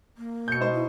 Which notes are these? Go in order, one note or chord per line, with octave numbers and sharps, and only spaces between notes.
A#3
B2 G6 C#7
G#3 D#4 C5
E4